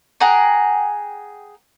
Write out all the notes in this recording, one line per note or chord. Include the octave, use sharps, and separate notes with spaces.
G#4 F#5 G5 A#5